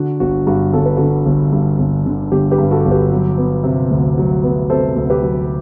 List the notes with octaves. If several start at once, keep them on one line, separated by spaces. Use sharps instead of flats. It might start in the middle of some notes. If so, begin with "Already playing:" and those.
Already playing: D3 F#4
G1 F#4
G2 F#4
G1 A4
B4
D3 F#4 A4
G1
G2
G1
D3
G1 G4
G4 B4
G2
F#4 A4
G1
G4 B4
F#3
B3
C3
D2
F#3
B3
C3 A4 C5
D2
G4 B4
F#3